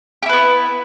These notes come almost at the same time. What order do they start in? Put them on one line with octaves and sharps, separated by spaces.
G4 E4 B4 B3